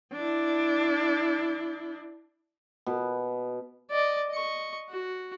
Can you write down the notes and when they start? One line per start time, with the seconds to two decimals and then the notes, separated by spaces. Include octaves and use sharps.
0.13 D4 E4
2.86 B2
3.91 D5 D#5
4.30 D#5 C#6
4.89 F#4